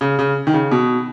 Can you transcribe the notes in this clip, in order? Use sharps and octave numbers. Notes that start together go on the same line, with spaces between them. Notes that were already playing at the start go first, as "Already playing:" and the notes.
C#3
C#3
D#3
C#3
B2